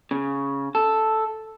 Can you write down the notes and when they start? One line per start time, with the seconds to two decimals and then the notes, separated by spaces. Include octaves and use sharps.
0.11 C#3
0.75 A4